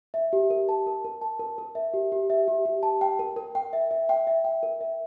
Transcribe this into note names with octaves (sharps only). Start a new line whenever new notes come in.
E5
G4
A#4
A5
A#4
A#4
A5
A#4
A#4
E5
G4
G4
E5
G4
G4
A5
G5
A#4
A#4
G5
E5
E5
G5
E5
G5
A#4
E5